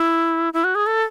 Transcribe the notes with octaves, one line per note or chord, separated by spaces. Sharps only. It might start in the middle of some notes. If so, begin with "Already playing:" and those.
Already playing: E4
E4
F#4
G#4
A4